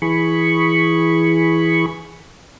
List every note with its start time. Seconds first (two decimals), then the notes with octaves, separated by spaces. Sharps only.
0.02 E3 G#4 B5 C#6